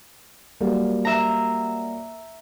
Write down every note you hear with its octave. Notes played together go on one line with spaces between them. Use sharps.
F#3 G3 A#3
E5 A#5